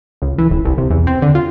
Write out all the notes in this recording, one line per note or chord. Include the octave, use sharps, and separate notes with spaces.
C#2
E3
D#1
C2
C3
E2
C4
D3
F4